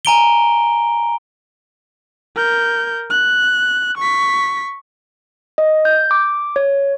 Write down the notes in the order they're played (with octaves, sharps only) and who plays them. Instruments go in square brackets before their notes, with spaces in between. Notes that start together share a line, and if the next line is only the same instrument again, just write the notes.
[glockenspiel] G#5 A#5 D7 G7
[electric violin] A#4 G6
F#6
C#6 B6
[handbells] D#5
G6
D6
C#5